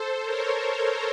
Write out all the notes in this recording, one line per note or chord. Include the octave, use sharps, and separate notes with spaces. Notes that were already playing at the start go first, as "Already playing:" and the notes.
Already playing: A4 C5
A#4 C#5